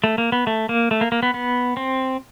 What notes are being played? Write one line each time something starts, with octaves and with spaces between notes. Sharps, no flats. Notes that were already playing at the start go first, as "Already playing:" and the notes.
A3
A#3
B3
A3
A#3
A3
A#3
A#3
B3
B3
C4